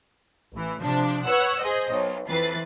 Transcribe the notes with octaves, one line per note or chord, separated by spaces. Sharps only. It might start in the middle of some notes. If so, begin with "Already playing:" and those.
A1 E3
C3 F3 D4
B4 C#5 F#5 E6 F#6
G#4 C5 D#5
B1
F2 E3 B4 A6 C7